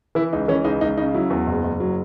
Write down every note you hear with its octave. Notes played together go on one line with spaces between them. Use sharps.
E3 E4
C#2 D#4
E3 C#4
C#2 D#4
C#2 D#4
C#3 D#4
F#3 E4
E2
F#1
F#1
F#3